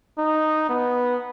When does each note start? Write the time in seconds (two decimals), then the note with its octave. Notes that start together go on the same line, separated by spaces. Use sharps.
0.18 D#4
0.70 B3